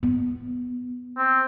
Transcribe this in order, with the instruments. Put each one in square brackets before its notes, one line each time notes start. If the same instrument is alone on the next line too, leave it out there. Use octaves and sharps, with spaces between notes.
[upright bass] B3
[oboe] C4